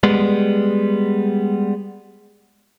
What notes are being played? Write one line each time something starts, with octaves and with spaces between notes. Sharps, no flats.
G3 G#3 B3